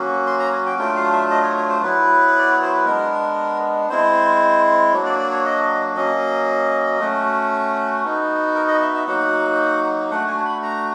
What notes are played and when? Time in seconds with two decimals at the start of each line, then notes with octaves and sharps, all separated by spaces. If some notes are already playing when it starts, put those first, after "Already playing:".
Already playing: F#3 A#3 C#4 F#4
0.27 C6
0.40 A#5
0.53 G#5
0.66 G5
0.79 F#3 A3 D4 F4 G5
0.96 F5
1.13 E5
1.31 D#5
1.43 C#5
1.57 C#5
1.69 C5
1.82 F#3 B3 E4 B4
2.39 D5
2.51 C#5
2.62 C5
2.74 B4
2.85 G#3 B3 D4 A#4
3.90 G#3 C4 E4 C5
4.92 F#3 A#3 D4 F#4 C#5
5.06 D5
5.19 D5
5.31 C#5
5.45 D#5
5.96 F#3 A#3 C#4 D#5
6.99 A3 C#4 F#4
8.04 B3 D#4 F#4
8.55 A#4
8.68 D#5
8.82 E5
8.95 E5
9.07 F#3 A#3 D#4 F#4 F#5
10.10 A3 D4 F#4 F#5
10.28 G#5
10.45 B5
10.63 A#5